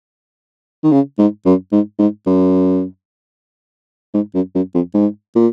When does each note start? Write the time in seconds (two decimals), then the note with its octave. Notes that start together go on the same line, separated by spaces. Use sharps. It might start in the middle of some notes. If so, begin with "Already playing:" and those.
0.83 D#3
0.92 C#3
1.18 G#2
1.46 F#2
1.72 G#2
1.99 G#2
2.26 F#2
4.14 G#2
4.35 F#2
4.55 F#2
4.74 F2
4.94 G#2
5.36 A#2